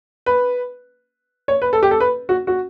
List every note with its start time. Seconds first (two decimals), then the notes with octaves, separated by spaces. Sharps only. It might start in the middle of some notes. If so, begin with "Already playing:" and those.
0.26 B4
1.48 C#5
1.62 B4
1.73 A4
1.83 G4
1.91 A4
2.00 B4
2.29 F#4
2.47 F#4